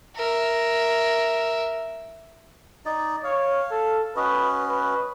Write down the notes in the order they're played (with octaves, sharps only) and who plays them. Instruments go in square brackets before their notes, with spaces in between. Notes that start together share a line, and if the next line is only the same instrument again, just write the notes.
[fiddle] A#4 E5
[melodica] D#4 D5 D#5
[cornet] C#5 [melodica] F5
[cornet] A4
[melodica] C#4 F#4 D#5 [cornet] B4
[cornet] B4